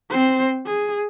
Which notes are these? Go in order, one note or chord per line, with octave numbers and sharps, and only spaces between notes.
C4 C5
G#4